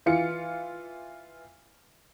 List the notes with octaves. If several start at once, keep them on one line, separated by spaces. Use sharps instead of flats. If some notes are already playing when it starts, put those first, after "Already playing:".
E3 F4 C#7